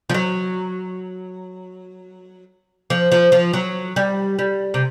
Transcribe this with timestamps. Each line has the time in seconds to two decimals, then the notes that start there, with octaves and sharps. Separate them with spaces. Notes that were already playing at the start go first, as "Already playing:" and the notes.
0.09 F3
0.14 F#3
2.90 F3
3.12 F3
3.32 F3
3.53 F#3
3.96 G3
4.39 G3
4.74 C3